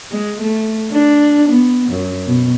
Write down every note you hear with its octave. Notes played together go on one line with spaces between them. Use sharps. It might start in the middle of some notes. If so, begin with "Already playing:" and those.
G#3
A3
D4
B3
F#2
B2